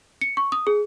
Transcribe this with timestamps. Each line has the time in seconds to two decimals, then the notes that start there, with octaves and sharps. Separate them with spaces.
0.21 C#7
0.37 C#6
0.52 D#6
0.67 G#4